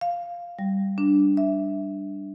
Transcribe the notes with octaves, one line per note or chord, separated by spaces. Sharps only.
F5
G3
D4
E5